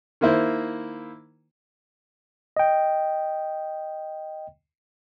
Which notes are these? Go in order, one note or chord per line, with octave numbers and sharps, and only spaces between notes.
D#3 A#3 E4 C5
D#5 G5